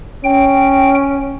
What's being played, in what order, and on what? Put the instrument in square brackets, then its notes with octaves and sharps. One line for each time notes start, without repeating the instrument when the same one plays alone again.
[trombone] C#4 [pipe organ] G5